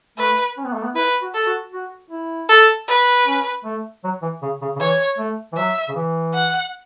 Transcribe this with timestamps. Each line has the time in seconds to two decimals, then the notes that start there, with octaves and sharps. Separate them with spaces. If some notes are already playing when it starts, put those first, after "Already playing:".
0.18 A3 B4
0.57 C#4
0.65 B3
0.74 A3
0.83 B3
0.95 E4 B4
1.22 F#4
1.34 A4
1.47 F#4
1.73 F#4
2.11 E4
2.49 A4
2.89 B4
3.27 C#4
3.65 A3
4.04 F#3
4.22 E3
4.43 C#3
4.62 C#3
4.76 C#3
4.80 E3 C#5
5.18 A3
5.53 E3
5.57 F#3 E5
5.89 C#3
5.95 E3
6.34 F#5